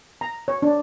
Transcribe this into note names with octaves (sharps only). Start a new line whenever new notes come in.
A#5
C#5
D4